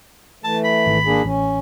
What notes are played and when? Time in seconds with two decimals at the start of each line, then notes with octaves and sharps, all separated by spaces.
0.44 E3 A3 A5
0.64 B5
0.86 G#1
1.06 A#3 D4 G#4
1.25 A1 C#4